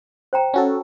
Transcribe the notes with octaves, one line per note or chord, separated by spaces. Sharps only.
C5 G5 A#5
C#4 F#4 A4